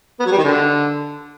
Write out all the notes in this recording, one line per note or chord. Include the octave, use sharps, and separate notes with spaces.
B3
F#3
G3
D#3
D3